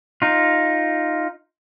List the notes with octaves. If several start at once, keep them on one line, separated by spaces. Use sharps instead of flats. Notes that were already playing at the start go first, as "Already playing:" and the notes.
D#4 F4